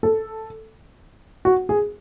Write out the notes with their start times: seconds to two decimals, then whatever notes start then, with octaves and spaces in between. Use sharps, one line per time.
0.03 A4
1.45 F#4
1.69 G#4